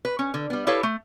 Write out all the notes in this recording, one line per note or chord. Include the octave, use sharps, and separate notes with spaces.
B4
C#4
D3
G3 B3
E4 G4 A4 B4 C#5 F5
A3